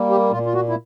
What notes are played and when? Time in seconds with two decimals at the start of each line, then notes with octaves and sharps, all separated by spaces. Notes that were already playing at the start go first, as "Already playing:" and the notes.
Already playing: G3 A#3
0.10 G4
0.31 A#2 F4
0.46 F4
0.54 F#4
0.69 E4